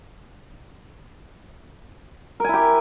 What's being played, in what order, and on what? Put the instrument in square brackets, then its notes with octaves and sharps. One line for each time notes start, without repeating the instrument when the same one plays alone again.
[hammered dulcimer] A#4
G#5
E4
G4